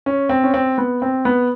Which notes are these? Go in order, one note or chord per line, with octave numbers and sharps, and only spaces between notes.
C#4
C4
C#4
C4
B3
C4
B3